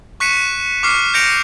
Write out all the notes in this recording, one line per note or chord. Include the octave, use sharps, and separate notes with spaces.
C#6 F#6 B6 C#7 D#7 E7
C#6 D6 F6 C7
G6 A#6 C#7 D7 F7